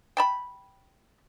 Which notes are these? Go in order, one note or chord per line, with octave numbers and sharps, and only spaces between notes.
G5 A5 B5